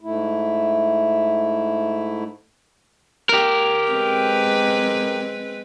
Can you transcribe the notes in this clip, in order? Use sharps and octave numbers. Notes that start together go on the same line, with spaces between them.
G#2 A3 E4
G4 A#4
G#3 C4 B4